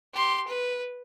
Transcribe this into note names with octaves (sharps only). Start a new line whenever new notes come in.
G4 C6
B4